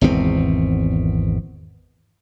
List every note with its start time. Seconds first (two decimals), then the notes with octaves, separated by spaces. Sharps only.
0.01 G#1 E2 B2 C4